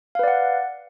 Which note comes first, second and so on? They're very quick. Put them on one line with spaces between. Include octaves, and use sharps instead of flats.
F5 B4 D5 F#5